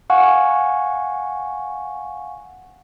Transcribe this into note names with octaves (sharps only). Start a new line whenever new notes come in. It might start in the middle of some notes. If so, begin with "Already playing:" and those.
F5 F#5 G#5 C#6